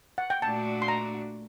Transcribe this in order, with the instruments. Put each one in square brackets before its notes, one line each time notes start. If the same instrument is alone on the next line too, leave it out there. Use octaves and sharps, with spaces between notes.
[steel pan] F#5
G5
[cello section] A#2 A3 D4 F#4 [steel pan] A5
[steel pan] C6
A#5